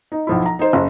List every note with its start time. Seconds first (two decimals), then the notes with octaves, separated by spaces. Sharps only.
0.12 D#4
0.27 B1 F3 E4
0.46 A#5
0.59 D#4 C5
0.73 F#1